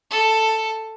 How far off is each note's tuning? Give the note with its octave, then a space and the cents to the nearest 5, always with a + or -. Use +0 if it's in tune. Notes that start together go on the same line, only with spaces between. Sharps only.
A4 +5